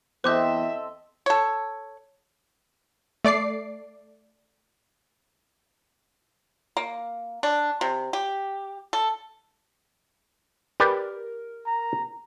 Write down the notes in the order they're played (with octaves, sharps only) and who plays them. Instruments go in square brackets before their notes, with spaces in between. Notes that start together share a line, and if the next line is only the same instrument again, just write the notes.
[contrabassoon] E2 [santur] C4 A4 D#5 [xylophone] C5 D6 G6 [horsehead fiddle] E5
[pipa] A4 C#5
[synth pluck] A3 D5 D6 C7
[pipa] A#3
D4
C3
G4
A4
[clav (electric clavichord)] G4 B4 D5 [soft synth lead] A#4
[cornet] A#5